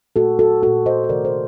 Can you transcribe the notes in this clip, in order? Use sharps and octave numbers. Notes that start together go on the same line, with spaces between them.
A#2 A3 F#4 A4
F#4 A4
A#2 A3 F#4 A4
C5 D#5
D#5
C3 D#3 A3 A#4 D5
A4 C5